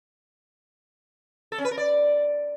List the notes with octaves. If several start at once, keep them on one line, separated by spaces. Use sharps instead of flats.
A4
C#4
B4
A#4
D5